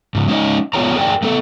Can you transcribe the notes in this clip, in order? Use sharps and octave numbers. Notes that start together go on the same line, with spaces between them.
G#2 C#3
G#3 C#4 D#4 C#5 D#5
B3 F4 G#4 C#5 D5 A#5
G#4 A#4 D5 G5
A3 B3 A4